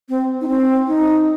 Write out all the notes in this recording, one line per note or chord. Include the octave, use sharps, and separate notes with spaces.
C4
D#4
C4
D#4